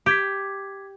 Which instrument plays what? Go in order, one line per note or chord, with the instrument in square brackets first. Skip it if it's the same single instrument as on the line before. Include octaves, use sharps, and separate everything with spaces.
[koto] G4 [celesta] D6 G#6 B6